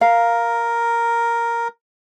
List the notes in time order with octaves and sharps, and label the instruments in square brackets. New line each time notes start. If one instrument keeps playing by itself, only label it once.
[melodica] A#4 [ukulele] F5